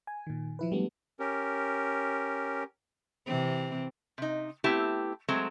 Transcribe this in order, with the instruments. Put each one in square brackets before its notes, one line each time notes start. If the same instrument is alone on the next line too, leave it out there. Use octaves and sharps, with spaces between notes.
[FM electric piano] G#5
A#2 D#3
F3 E4 B4
F#3 G3 A3 B3 D4
[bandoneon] C#4 G4 A#4
[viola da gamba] C3 E3 C4
[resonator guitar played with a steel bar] C3 D#4
A3 B3 C4 E4 G4
F#3 G#3 A3 C4 A#5